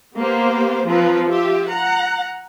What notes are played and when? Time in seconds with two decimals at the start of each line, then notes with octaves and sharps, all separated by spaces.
0.16 A#3 B3 G4 C5
0.87 F3 C4 B4 A#5
1.29 F4 G4 E5
1.70 F#5 A#5